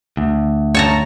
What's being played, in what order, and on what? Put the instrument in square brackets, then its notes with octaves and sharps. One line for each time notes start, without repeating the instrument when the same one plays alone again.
[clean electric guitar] D2
[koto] C#5 A5 A#5